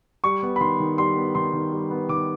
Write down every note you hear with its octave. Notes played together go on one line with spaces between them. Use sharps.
G3 C#6
B3
B5
D#3 C6
D#3
G3 C6
B3
D#3 C6
D#3
G3
B3
D#3 D6